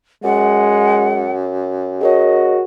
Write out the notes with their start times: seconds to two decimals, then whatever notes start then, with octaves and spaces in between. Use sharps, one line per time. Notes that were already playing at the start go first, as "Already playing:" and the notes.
0.24 F#2 G#3 F#5
2.01 F#4 G#4 A#4 C#5 D#5